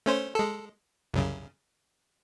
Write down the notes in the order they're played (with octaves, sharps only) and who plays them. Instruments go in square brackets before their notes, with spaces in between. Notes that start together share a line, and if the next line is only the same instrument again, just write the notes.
[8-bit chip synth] A3 C#4 C5
G#3 A4
C2 F#2 C#3